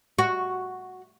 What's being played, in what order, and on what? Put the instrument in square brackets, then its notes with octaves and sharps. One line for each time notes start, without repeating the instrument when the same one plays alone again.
[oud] F#4